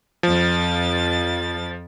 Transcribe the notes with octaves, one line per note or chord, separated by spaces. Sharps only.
F2 F3 A6